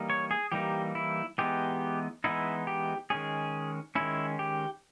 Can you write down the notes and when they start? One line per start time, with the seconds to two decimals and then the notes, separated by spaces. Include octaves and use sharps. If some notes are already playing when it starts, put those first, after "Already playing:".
Already playing: E3 G3 A#3 D#4
0.10 C#5
0.31 G#4
0.52 E3 G3 A#3 D#4 G4
0.95 E4
1.38 E3 G#3 B3 D#4 G4
2.24 E3 G#3 B3 D#4 E4
2.67 G4
3.10 D#3 G#3 C#4 G#4
3.95 D#3 G#3 C#4 E4
4.39 G4